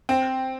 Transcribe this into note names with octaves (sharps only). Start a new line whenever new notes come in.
C4